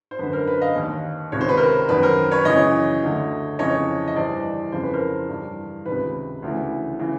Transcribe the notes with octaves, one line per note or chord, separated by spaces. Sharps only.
C5
F#2 D3 B4
A#4 C5
B4
D#5 F5
D#2 D#3
C#2 C3 D#3 C#5
C5
B4
A#4 C5
F#2 D#3 B4
A#4 C5
B4 C#5
F#2 C#3 E3 C#5 D#5
D2 D3
F2 C#3 E3 C#5 D#5
D#5
G2 E3 C5 D5
F2 C#3 E3 C5
B4
A#4 C5
G2 E3
C#2 C3 D#3 B4
D2 C#3 E3
C#3 E3